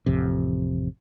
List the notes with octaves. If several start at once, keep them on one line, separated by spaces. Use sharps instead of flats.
A1 F2 C3